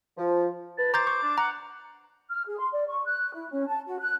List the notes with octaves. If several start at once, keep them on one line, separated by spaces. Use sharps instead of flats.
F3
B4 A5
C5 A#5 D6 G6 A6
C#6
D4
F#5 A#5
F6
G#4
C6
D5
C#6
F#6
E4
C#4
A5
F#4
F#6